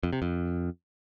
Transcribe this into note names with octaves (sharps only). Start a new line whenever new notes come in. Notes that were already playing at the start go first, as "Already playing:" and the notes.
F2
C3
F2